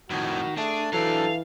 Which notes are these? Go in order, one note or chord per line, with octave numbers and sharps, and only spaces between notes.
F2 A2 D#3 F#4
A3 D4 G#4
E3 F#3 D4 A4 F5